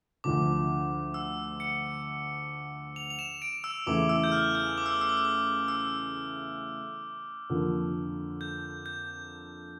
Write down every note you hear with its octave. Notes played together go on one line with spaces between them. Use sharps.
D2 D3 F3 D6
E6
C#7
F7
F7
E7
D7
E6
E2 C#3 E3 A3 E4 D6
E6
G6
F6
G6
D6
E6
D6
E6
D6
E6
D6
E6
F2 D3 F3 A#3
G6
G6